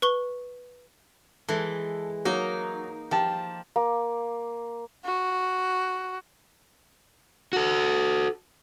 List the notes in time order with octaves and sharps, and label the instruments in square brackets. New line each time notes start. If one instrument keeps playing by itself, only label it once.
[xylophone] B4 C#6 G7
[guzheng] E3 G#3 [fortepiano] A4
[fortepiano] F#3 [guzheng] A#3 D#4
[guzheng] F3 [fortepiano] G4 A5
[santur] A#3
[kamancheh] F#4
[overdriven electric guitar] F#4 A4